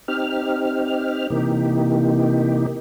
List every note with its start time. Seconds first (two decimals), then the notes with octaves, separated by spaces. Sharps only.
0.08 C4 D#4 G4 F6
1.30 C3 E3 A#3 D#4 G4